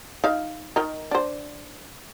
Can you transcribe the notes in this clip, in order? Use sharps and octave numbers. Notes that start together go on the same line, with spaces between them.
D#4 F5
D#3 D#4 A#4
D4 C5